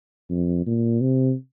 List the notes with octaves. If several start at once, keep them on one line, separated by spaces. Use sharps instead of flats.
F2
A#2
C3